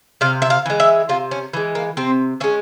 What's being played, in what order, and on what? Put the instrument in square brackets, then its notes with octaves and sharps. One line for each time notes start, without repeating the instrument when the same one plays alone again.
[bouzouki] C3 F5
E5
F5
E3 G#3
E5
C3 F4
C#4
E3 G#3
A#3
C3 C4
E3 G#3 C#4